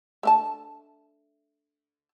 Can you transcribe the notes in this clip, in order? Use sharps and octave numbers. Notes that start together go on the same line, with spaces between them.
A3 D4 A5